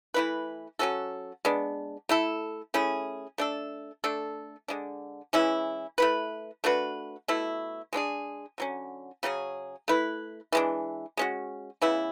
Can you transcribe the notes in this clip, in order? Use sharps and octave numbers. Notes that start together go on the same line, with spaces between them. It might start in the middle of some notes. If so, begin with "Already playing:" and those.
E3 A3 E4 B4
F#3 C#4 F#4 A4
G#3 B3 D4
A3 E4 A4
A3 C#4 E4 G#4
A3 D4 A4
A3 D4 A4
D3 G#3 D4
E3 G#3 C#4 E4
A3 E4 B4
A3 D4 F#4 B4
B2 A3 E4
G#3 B3 D4 G#4
D3 F#3 C#4
C#3 F#3 C#4 G#4
A3 E4 B4
E3 G#3 D4
G#3 C#4 F#4
C#3 E3 B3 E4